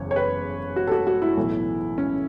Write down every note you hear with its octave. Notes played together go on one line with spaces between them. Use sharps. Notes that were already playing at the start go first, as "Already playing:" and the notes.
Already playing: F#1 E2 C#3 E3 C#5
C#5
B4
F#4
A4
F#4
F#4
E4
B1 A2 E3
C#4